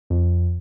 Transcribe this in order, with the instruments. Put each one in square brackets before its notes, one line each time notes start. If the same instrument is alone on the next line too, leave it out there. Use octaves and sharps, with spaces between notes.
[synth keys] F2